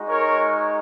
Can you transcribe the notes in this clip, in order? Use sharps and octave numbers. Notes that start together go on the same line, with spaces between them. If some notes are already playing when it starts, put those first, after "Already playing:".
Already playing: G#3 D#4 F#4
A#4 C#5